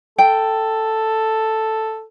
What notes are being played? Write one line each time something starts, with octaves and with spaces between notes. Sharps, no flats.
A4 G5